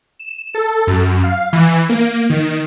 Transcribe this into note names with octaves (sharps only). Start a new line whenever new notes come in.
E7
A4
F#2
F5
E3
A#3
D#3